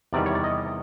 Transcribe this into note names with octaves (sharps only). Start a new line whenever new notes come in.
E2 C3 D#3 G3 D5
C#5
D5
D#5